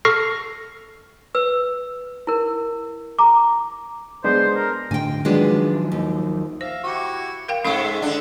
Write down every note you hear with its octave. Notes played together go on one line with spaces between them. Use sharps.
A4 C#6 F6 A#6 C7
B4 E6
E4 A#4
A#5 D6
G#3 B3 D4 C5
A#4
A2 D3 G5 G#5
D#3 F3 F#3 G#3 B3 D4
D#2
C5 E5 F5
E4 F#4 G4
A#4 F5 G5
G#2 G#3 A3 C#4 E5 F5 C#6
D3 D4